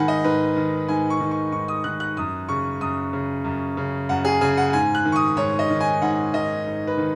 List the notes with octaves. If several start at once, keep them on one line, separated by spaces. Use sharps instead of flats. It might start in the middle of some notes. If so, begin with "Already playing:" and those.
Already playing: G#2 D#3 F#5 G#5 B5
D#5
G#2 B4
D#3
G#2 G#5
C#6
D#3
C#6
G#2 C#6
D#6
D#3 F#6
F#6
F#2 D#6
C#3 C#6
F#2 D#6
C#3
F#2
C#3
F#2 F#5
G#4
C#3 G#5
F#5
G#2 G#5
F#6
D#3
C#6
D#6
G#2 C#5
D#5
D#3
G#5
G#2 F#5
D#3 D#5
G#2
B4
D#3